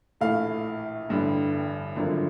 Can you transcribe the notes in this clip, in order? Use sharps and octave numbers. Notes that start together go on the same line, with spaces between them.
A#1 A2 E3 A3 F5
A1 G2 D3 G3
G#1 F#2 D3 F3